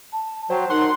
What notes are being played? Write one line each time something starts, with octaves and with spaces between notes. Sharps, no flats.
A5
F#3 C5 G5
D#4 A#4 F#5 C6